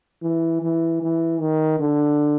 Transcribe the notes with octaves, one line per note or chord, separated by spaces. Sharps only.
E3
E3
E3
D#3
D3